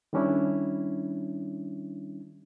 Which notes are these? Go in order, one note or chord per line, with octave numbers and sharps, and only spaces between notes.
D#3 G3 C#4 D4 E4